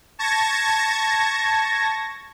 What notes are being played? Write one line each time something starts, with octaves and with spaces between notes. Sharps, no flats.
A5 C#6 G#6 A#6